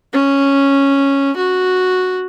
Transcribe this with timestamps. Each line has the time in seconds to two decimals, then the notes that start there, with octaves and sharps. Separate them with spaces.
0.14 C#4
1.37 F#4